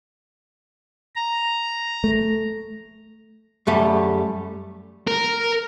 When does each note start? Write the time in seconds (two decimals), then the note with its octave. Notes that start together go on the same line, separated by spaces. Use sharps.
1.16 A#5
2.04 A3
3.67 F#2 G3 A3
5.08 A#4